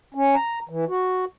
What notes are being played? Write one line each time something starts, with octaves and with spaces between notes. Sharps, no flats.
C#4
A#5
E3
F#4